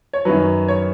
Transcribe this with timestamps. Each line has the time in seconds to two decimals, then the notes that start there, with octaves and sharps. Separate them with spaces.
0.13 C#5
0.25 F#2 D#3 F#3 B4
0.68 C#5